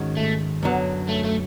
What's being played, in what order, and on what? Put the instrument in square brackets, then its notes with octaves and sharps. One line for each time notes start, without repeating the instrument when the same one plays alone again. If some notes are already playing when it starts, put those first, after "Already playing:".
Already playing: [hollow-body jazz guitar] G#2 D#3 G#3 C#4 F#4
[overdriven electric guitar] A3
[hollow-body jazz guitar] F#2 D3 F#3 B3
[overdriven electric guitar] A3
A3